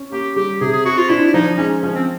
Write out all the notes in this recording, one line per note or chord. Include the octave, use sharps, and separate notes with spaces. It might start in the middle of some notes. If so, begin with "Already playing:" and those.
Already playing: C#4
A#3 G4
G3 G4
C3 G#4
G#4
C4 F#4
F4
D4 E4
E4
F3 D#4
G#3 C#4
F3 C#4
C4